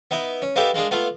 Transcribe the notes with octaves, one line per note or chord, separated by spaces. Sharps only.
B3 D#4 E4
C#4
A#3 B3 D#4 E4 G4 A4
G#3 A#3 D4 G#4
A3 B3 F4